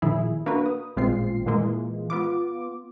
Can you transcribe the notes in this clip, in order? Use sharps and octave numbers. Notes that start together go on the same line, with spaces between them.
A#2 D#3 F3 E4 G#4
A#3 B3 D4 F#4 B4
D#6
A1 A#2 G#3 C4 F4 C7
A#2 E3 G#3 A#3
B3 F4 D6